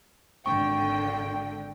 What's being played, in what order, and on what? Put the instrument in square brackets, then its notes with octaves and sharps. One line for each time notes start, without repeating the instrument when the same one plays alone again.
[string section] G#1 D3 G5 [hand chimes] C#6